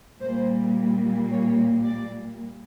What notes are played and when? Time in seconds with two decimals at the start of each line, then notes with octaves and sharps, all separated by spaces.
0.20 A#2 G3 A#3 C5
1.29 C#5
1.84 D5